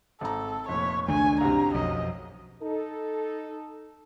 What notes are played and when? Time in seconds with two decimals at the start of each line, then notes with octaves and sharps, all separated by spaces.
0.21 G#1 A4 A#5
0.68 F1 A#2 C#5 B6
1.08 C#2 D#3 A3 D4 G#5
1.41 C2 F#2 C3 A#5
1.74 B1 F2 F#3 D#5
2.62 D#4 A4